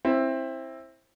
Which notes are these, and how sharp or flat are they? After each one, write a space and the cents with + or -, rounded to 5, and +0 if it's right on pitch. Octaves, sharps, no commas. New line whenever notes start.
C4 +20 E4 +0